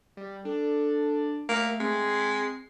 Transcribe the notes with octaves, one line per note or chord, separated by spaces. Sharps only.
G3
D4 A4
A3 A#3
G#3 C4
C7